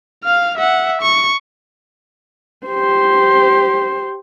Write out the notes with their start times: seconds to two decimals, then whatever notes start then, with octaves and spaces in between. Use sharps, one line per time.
0.24 F5 F6
0.57 E5 F#5
1.02 C#6
2.66 G4 C5